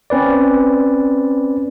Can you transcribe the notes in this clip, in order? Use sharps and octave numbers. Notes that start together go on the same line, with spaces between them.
C4 C#4 B4 D5